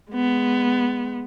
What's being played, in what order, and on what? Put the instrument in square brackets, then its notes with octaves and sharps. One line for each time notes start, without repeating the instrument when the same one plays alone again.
[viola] G#3 B3